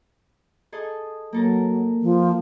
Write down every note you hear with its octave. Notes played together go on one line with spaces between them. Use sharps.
G#4 A4 D#5
F#3 A#3 A4 A#4
F3